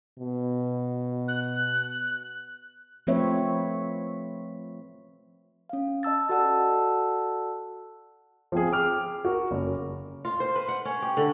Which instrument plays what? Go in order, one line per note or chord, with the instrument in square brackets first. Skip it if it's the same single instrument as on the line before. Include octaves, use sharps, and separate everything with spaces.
[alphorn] B2
[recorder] F#6
[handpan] F3 A3 C4 B4 C#5 E5
[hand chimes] C#4 F5
D#5 A5 E6 A6
F#4 A4 D5 F#5 A5 E6
[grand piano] F3 C4 G#4
G5 D6 F6
F#4 A#4
F#1
[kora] F4
C5
B4
F#5
C#4
G4
D3